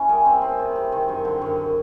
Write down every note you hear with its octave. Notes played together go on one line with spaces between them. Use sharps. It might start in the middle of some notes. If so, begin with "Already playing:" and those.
Already playing: C#4 E4
G3 G#4 A#4
C4
C4
C3
C3
D#3
F#2
D3
F#2